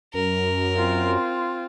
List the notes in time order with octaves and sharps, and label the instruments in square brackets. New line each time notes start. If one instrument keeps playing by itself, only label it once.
[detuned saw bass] F#2 [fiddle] A#4
[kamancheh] C4 F4